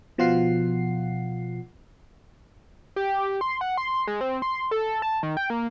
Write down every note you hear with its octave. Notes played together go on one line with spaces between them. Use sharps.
B2 F3 F4 F#5 C7
G4
C6
F#5
C6
G#3
C4
C6
A4
A5
D#3
G5
A#3